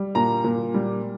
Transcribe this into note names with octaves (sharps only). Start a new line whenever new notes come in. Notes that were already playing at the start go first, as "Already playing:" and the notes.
Already playing: G3
A#2 A#5
A#2
G3